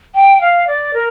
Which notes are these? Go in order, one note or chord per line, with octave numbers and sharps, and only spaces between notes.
G5
F5
D5
A#4